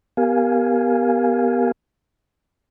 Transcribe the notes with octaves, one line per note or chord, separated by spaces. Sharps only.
B3 G4 A#4 F5 G#5